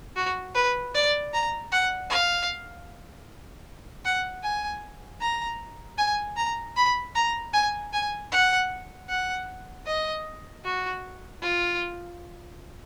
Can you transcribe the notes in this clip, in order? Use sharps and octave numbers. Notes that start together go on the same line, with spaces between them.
F#4
B4
D5
A#5
F#5
F5
F#5
G#5
A#5
G#5
A#5
B5
A#5
G#5
G#5
F#5
F#5
D#5
F#4
F4